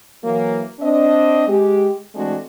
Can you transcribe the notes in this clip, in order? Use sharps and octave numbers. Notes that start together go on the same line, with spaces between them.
E3 F#3 A#3
C4 D4 D#5
G#3 G4
E3 G#3 A3 C4 D4 F#4